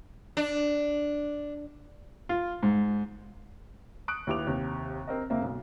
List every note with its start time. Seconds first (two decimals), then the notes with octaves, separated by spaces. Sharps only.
0.37 D4
2.29 F4
2.63 G#2
4.08 C#6 D#6 F#6 D7
4.27 D#2 E4 G4 B4 D6 F7
4.47 D#2 C3
5.07 C4 A#4 D#5
5.30 F#1 A#3 C4 E5
5.42 B1